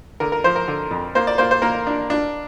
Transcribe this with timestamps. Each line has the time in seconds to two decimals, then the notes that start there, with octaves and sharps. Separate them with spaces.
0.20 D3 A#4
0.32 A#4
0.44 F3 C5
0.56 A#4
0.68 D3
0.91 F2
1.15 A#3 C5
1.27 D5
1.38 A#3 C5
1.51 C5
1.62 A#3 A#4
1.87 D4
2.10 D4